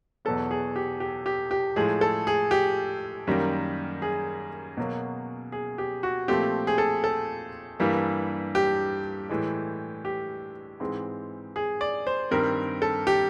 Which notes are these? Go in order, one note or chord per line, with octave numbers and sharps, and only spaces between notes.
E2 B2 F#3 B3 A4
G#4
G4
G4
G4
G4
A2 F3 G#3 G#4
A4
G#4
G4
F#2 D#3 G3 A#3
G#4
B2 F#3 A#3
G#4
G4
F#4
A#2 F3 A3 C4 G4
G#4
A4
A4
G2 E3 G3 A#3
G4
A2 E3 G#3
G4
G#2 E3 G#3 C4
G#4
D5
C5
G2 D#3 G3 C4 A#4
A4
G4